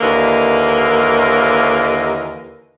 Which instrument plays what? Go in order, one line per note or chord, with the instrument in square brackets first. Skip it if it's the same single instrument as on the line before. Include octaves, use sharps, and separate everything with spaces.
[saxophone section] D#2 D3 E3 A#3 D#5